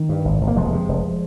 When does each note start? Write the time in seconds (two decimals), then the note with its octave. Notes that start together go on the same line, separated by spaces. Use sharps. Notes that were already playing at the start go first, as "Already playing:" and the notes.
Already playing: D#3
0.09 G2
0.25 G#1
0.41 G#1
0.48 A#3
0.56 F1 F3 G#3
0.72 C3
0.89 F1